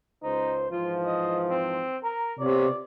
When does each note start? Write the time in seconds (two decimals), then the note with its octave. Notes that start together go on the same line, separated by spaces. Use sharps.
0.23 C#2 D#4 C5
0.71 G#2 E3 F3 F4
1.06 D#5
1.50 C4
2.04 A#4 A#5
2.39 C3 B3 F4 C#5 D5